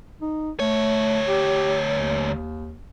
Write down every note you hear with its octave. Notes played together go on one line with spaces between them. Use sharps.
D#4
D2 A3 C#5
G4
D#2